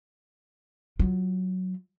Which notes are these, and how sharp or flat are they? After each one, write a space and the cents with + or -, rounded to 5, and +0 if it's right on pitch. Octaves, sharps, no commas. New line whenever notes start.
F#3 +0 F4 +0